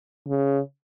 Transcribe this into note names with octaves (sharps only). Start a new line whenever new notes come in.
C#3